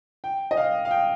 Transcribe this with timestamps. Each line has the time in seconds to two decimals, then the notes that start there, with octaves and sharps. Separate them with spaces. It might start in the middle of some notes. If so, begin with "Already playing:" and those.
0.24 G5
0.51 D#5
0.57 F5
0.85 F5
0.91 G5